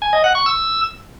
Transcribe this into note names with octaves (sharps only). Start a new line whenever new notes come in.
G#5
D#5
F#5
C#6
E6